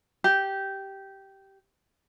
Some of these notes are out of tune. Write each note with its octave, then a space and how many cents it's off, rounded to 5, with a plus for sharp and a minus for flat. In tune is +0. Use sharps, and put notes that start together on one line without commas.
G4 -10